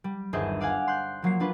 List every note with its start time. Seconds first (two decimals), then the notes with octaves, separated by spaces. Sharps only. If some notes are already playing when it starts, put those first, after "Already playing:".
0.04 G3
0.33 G1 D#2 G#4 C5 D#5 E5
0.60 D5 F5 F#5 G#5
0.87 C6 F#6 G6
1.22 F3 F#3 A#3 C7
1.40 F#3 D4 F4 B4